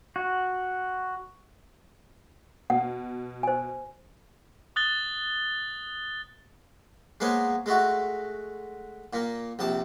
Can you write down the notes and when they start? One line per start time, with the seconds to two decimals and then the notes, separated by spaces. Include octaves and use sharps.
0.16 F#4
2.70 B2 F#5
3.43 C5 G#5
4.76 D#6 F#6 A6 G7
7.20 G#3 A#3 B3 C5 C#5
7.66 G#3 A3 F#4
9.13 A#2 A#3
9.59 A#1 C3 A5